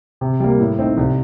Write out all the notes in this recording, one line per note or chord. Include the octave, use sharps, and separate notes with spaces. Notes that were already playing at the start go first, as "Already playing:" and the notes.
C3
G3 A#3
A2
A3 C4 D#4
C2